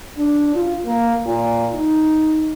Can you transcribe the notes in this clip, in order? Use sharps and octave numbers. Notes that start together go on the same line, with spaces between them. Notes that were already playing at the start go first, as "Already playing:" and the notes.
D4
F4
A#3
A#2
D#4